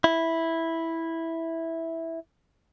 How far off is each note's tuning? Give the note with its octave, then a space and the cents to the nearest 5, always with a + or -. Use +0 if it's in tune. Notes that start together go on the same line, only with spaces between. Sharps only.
E4 -5